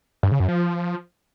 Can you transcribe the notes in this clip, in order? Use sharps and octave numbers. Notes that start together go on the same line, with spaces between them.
G2
C#3
F#2
F3